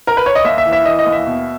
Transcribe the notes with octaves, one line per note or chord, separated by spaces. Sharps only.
A#4
B4
C#5
D#5
D#2 E5
E5
E3
E5
E3 D#5
D#5
D#2
E5
B2